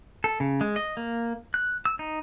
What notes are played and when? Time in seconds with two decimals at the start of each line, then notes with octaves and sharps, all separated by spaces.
0.24 A4
0.40 C#3
0.61 G#3
0.76 D#5
0.97 A#3
1.54 F#6
1.85 E6
1.99 D#4